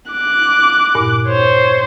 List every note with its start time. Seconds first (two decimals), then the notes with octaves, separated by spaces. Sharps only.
0.12 D6 F#6
0.95 E2 G2 A#2
1.28 C5 C#5